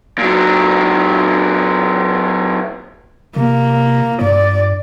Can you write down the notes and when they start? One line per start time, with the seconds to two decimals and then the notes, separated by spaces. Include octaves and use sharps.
0.19 A#2 F#3
3.36 C3 A#3
4.21 G2 D5